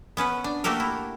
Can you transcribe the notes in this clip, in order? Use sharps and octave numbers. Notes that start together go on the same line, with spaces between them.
B3 C#4 B4 F#5
D4
A3 A#3 F#4 G4 A4 A#4
E4